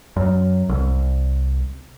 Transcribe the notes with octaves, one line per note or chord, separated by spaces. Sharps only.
F#2
C2